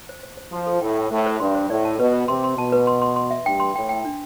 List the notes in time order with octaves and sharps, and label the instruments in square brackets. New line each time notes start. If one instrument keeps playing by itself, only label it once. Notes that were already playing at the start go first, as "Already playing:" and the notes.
[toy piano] C5
C5
C5
[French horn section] F3 [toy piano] C6
[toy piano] A4
[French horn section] A2 [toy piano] G5
[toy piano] G5
[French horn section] A2 [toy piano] C5
[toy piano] C5
[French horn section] G2 [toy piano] C6
[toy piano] C5
[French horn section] A2 [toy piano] D5
[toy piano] A5
[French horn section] B2 [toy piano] B4
[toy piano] B4
[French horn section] C3 [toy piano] C6
[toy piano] C6
[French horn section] B2 [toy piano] A5
[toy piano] B4
C6
C6
C6
E5
[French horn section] G2 [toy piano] G5
[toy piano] C6
[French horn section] A2 [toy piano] G5
[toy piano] G5
D4